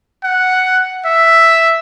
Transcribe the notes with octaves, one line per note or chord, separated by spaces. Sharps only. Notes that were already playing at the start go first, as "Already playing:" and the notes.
F#5
E5